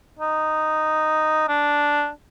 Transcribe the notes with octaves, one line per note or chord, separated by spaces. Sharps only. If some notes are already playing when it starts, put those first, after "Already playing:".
D#4
D4